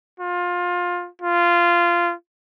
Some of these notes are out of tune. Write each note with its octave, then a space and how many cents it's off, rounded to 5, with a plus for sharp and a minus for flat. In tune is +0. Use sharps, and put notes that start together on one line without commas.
F4 +20
F4 -15